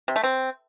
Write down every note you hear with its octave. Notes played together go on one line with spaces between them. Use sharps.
C3
A3
C4